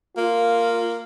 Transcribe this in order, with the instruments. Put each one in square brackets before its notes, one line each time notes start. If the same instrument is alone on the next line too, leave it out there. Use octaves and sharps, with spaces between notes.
[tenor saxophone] A#3 [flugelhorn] F4